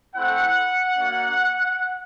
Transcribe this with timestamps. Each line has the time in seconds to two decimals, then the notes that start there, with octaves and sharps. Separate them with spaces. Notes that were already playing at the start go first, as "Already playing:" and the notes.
0.15 A3 C4 E4 F#5
0.96 A#3 D4 F#4